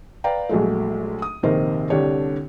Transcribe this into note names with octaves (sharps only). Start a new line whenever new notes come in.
B4 D5 F5 G5 A#5
A#1 F#3 G#3 A3
D#6
A#1 C3 D#3 D#4 A#4 C5
C2 D3 D4 G4 C#5